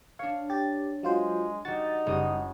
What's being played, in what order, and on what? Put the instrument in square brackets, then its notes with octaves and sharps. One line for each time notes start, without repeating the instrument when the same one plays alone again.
[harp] D4 C#5 [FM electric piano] F5
[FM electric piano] G4 [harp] A6
[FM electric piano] F#3 F4 C5 [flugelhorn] G#3
[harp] G3 F#4 [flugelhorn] D#4 [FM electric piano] A6
[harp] F#1 D#6 [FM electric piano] G3